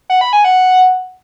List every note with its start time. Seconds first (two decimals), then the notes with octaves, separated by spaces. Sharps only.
0.10 F#5
0.21 B5
0.33 G#5
0.44 F#5